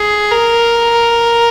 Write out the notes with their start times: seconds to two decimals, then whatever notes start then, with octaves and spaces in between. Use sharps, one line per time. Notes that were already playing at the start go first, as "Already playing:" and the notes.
Already playing: G#4
0.31 A#4